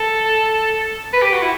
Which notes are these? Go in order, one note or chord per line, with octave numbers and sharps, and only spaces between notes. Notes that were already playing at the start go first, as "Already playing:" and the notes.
Already playing: A4
B4
G4
F#4
E4